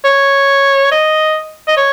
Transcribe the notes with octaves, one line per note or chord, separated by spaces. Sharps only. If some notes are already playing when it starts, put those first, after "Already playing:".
C#5
D#5
D#5
C#5